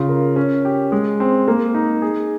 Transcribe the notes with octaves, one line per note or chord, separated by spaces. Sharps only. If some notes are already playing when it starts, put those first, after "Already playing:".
Already playing: C#3 F4
A#4
C#4
G4
G#3
C4
A#3
D#4
G#4